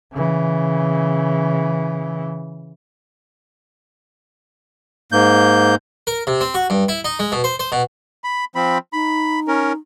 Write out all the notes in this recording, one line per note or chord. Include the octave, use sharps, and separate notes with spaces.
C#3 E3
G#2 A#3 G6
A#4
C3
C4
F#4
G2
E4
D#4
G#3
B2
C5
C5
B2
B5
F3 C4 B5
D#4 B5
C#4 A#4